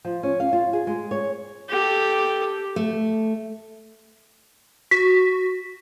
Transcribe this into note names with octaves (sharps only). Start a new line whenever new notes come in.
F3
C#4
F5
F4
G#4
G#3
C#5
G4 A4
A3
F#4 B6